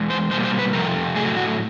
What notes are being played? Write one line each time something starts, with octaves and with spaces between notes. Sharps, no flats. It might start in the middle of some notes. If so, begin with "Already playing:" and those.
Already playing: E2 G#3
C5
B2 G3 A#3 C5
C5
B4
F2 C3 F3 A3 A#4
A2 F#3 A3 G#4
F#4